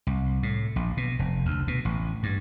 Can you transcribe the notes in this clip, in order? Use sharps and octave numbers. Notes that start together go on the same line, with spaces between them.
C2
A2
A#1
B2
F1
D2
B2
A1
G2